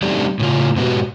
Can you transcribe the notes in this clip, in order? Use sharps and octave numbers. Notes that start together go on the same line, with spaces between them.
G3 A3 C4 D4 D#4 G4
A2 C#3 F4
G#2 B2 B3 C#4 F#4 G4